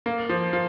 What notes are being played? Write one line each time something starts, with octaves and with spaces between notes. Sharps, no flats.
A#3
F3
F3